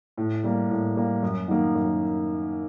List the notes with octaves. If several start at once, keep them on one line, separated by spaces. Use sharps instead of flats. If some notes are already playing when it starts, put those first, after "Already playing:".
A2
G3 A#3
A2
G3 A#3
F#2
D#3 F#3 A#3
F#2